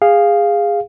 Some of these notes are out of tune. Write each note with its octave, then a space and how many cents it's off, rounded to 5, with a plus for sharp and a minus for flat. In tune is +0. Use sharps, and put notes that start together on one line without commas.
G#4 -20 F5 +0